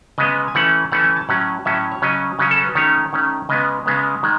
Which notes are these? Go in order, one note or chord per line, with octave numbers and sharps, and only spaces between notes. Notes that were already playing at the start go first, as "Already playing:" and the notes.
C#3 G#3 B3 D#5
G#5
E3 A3 C#4 F#5
E3 A3 C#4 F#5
A5
G#5
A5
A2 F#3 C#4 F#5
A2 F#3 C#4 E5
C#5
C#3 F#3 C#4 D#5
C#3 F#3 C#4
A4
B4
D#3 A3 C#4 C#5
D#3 A3 C#4
C#3 G#3 B3 D#5
C#3 G#3 B3
D#3 G#3